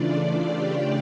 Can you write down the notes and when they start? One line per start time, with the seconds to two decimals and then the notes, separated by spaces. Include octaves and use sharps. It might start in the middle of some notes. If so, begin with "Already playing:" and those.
Already playing: C#3 E3 A3 D4 F4 D5
0.39 G4